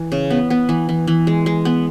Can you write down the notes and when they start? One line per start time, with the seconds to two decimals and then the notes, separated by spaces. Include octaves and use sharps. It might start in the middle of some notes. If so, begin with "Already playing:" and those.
Already playing: E3
0.12 C#3
0.30 B3
0.50 B3
0.69 E3
0.89 E3
1.07 E3
1.27 G#3
1.46 G#3
1.65 B3